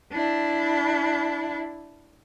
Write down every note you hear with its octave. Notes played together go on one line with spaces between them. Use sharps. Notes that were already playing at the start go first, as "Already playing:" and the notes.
D4 E4